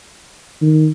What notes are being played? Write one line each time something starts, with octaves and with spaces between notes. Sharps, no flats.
D#3